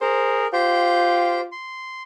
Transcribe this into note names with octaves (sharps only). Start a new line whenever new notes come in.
G#4 A#4 C5
F4 G4 C5 G5
C6